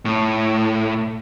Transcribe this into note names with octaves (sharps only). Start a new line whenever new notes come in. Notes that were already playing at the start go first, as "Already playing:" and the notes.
A2